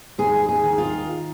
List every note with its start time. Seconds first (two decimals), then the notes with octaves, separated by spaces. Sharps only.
0.18 D#2 G#4
0.49 G#4
0.64 D#3
0.78 F4